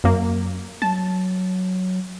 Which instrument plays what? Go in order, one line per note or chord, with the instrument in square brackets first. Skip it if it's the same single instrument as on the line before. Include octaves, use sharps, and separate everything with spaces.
[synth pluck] F#2 A#3
[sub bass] F#3 [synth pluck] A5